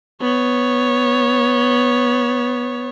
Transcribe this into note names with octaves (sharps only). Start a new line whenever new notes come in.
B3 C#5